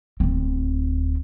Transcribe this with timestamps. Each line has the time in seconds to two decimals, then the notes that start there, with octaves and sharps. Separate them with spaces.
0.20 D1 C4